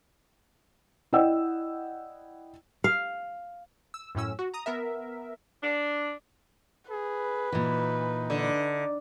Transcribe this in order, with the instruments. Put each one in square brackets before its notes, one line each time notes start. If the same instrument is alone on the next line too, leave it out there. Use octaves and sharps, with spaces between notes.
[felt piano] E4 D5 D#5 F#5 G5 E6
[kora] F5
[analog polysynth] E6
F#2 A2 C#4 E6
F#4
A#5 D#6
B3 A#4 E5
[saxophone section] D4
[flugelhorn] G#4 [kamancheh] B4
[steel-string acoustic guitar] A#2 E3 [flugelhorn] D#4
[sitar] D3